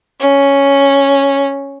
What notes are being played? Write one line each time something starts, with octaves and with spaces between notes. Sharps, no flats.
C#4